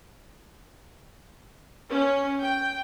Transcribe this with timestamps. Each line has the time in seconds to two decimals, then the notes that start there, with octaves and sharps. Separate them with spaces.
1.90 C#4
2.41 G5